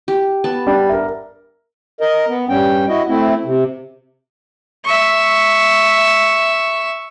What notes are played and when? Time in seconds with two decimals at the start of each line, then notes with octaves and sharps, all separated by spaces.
0.08 G4
0.44 B3 A5
0.67 G3 D4
0.89 A#4 E5
2.00 A#4 D#5
2.28 B3
2.49 G2 G3 C#4 G5
2.88 E4 F#4 D#5
3.08 A3 C4 E4
3.45 C3
4.85 E5 C#6